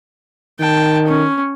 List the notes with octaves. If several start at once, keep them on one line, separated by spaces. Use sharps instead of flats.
D#3 G5 A5
C#4